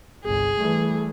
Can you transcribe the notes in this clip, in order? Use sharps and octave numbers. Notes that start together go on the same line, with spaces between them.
G1 C2 G#4
E3 G3 A3